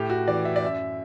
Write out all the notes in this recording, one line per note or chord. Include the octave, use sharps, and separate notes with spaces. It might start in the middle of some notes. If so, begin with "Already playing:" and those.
Already playing: A2 G4
F#4
E3 D5
E5
D5
F#2 E5